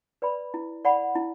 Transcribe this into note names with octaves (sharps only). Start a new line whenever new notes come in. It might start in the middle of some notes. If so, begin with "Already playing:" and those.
B4 D5 B5
E4
D5 F#5 B5
E4